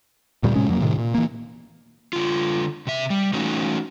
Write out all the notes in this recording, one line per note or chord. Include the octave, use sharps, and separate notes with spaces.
D2 A#2 G3
A2 C3 G#3 C#4
F2 F#3 A#3
A2 C3 D#3
A#2
E3 A#3
D3 F4
C3 E5
G3
E3 A3 C#4 D#4 F#4